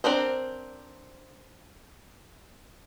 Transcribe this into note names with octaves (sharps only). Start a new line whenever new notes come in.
C4 D4 A#4 C5